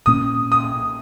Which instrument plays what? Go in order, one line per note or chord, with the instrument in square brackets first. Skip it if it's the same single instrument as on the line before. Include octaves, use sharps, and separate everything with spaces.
[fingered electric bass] A#2 A#3 C#4 [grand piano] D#6
[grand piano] D#6